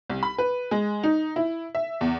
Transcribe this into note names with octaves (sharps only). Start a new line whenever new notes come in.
C2
B5
B4
G#3
D#4
E4
E5
E2